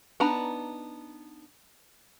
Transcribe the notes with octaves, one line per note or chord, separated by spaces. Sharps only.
B3 D4 D#4 A#5 B5